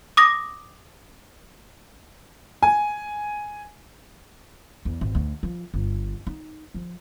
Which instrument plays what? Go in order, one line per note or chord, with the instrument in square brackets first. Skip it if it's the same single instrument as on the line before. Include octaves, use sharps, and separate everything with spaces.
[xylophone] D6 D#6 A#6
[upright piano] G#5
[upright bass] E2
G#1
D2
F3
G1
D#4
F3